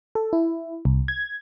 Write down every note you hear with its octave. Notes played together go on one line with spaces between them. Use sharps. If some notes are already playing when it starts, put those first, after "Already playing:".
A4
E4
C2
G#6